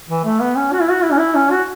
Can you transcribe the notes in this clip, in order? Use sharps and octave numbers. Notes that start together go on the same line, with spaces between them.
E3
A3
B3
C#4
F#4
E4
F#4
E4
C#4
E4
C#4
F#4